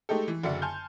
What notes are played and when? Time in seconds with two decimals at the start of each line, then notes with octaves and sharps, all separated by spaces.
0.09 G#3 A3 D#4 G4 A4
0.28 E3
0.43 F#1 D3 F#4 D5 E5 C#7
0.62 G#5 A5 C6 F6 G6